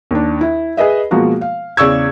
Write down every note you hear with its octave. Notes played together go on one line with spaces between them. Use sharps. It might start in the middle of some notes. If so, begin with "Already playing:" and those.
D#2 D4
E4
G#4 B4 D#5 E5
B2 F3 G#3 A#3 F#4
F5
E2 C#3 D5 C#6 E6 G#6